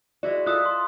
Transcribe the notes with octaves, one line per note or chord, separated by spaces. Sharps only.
G#3 E4 F#4 D5
F4 A4 E5 D#6 F#6
C6